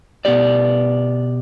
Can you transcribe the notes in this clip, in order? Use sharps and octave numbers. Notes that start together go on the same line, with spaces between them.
B2 B3 G4 D5